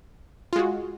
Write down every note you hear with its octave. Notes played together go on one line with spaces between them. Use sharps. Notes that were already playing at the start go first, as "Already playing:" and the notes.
G#3 F4 F#4